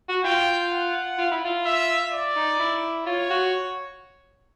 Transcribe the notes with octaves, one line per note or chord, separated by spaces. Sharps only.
F#4
F4 G5
F#5
F4
E4
F4
E5
D5
D#4
E4
F4 C#5
F#4